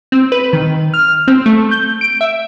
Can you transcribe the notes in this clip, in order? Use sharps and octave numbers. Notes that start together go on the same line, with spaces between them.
C4
B4
D#3
F6
C4
A3
G6
D7
E5